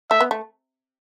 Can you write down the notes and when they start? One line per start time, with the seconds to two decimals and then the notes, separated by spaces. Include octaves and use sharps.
0.10 A3 E5
0.21 B3
0.31 A3